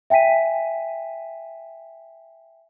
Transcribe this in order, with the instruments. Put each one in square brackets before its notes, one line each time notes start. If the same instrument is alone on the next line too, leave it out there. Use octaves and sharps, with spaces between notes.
[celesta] E5 G5 G#5 B6 D#7